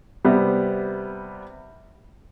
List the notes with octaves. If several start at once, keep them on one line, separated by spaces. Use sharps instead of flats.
C3 G3 B3